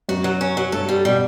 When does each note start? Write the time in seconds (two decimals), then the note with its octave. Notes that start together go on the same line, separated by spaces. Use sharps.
0.09 F#2 F#4
0.24 F#3
0.41 C#4
0.57 F#3
0.72 G2 A4
0.89 G3
1.05 B2 G3